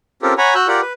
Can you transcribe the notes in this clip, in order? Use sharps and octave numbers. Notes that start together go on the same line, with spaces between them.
C4 C#4 F4 G4 A4 A#4
C#5 F#5 G#5 A#5 B5
F#4 E6 F#6 G6
F4 G4 A#4 D5 F#5 G5
B4